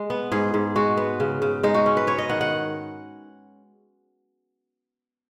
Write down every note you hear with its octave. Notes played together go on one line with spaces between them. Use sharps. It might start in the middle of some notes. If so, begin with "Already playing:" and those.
Already playing: G#3
B3
G#2 G#4
G#2
G#3 F#4
B3
C#3
C#3
G#3 D#4
F#4
C#4
B4
B3 C#5
D#5
D#3 F#5
F#5